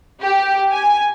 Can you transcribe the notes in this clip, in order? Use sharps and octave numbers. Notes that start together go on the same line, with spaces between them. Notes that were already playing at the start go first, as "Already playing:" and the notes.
G4
G#5